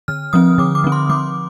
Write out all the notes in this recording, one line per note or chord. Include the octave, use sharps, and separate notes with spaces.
D3 F6
F3 C4 D#6
D3 D6
D6
F3 C4
C6
F3 D6